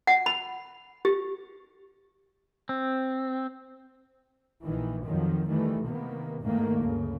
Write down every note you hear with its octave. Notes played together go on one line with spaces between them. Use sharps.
F#5
B5
G4
C4
A#1 D#3 E3
F2 D#3 F3 F#3
D#3 E3 G3 A3
C3 D#3 A#3 B3
E2 G#2 D#3 A3 A#3
D2 G2 C#3